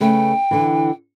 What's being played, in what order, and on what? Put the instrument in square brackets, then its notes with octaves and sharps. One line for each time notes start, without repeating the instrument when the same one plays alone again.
[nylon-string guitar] C#3 A3 B4 [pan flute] G5
[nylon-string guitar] D3 E3